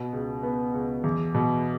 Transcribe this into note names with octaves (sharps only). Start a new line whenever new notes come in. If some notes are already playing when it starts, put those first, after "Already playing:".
Already playing: B2
C#2
B3
C#2
E2
B2